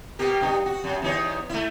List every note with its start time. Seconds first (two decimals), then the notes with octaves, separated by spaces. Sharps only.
0.19 B2 G4 A#4
0.41 G2 D#4
0.66 F#4
0.84 F#2
1.02 E2 D#4 C#5
1.49 A3 E4